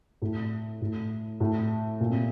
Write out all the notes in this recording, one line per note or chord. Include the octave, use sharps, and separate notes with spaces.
A2
A2
A2
A#2
C3